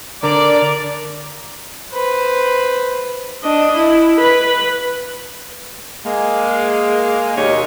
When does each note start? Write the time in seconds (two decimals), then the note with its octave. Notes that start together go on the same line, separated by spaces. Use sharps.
0.24 D3 A#4 D5
1.93 B4 C5
3.43 D4 D#5
3.76 E4
4.18 B4 B5
6.06 G#3 A#3
7.36 D#2 B2 G#3 D#4 G4 C#5